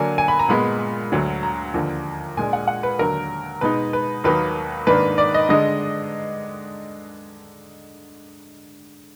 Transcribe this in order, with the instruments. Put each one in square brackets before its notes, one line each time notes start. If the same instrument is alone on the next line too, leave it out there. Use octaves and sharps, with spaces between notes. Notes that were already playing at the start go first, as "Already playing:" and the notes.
Already playing: [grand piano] D3 F#3 A#3 D4 G#5
G#5
B5
A#5
A#2 G#3 B3 B5
D2 D3 F#3
A#5
D#2 D3 F3
A#2 G#3 D4 G#5
F#5
F#5
B4
D#2 D3 F#3 A#4
B2 G#3 D#4 B4
B4
D#2 D#3 F#3 A#3 D#4 B4
G#2 D#3 A#3 D4 B4
D5
D#5
D3 G#3 D4 D#5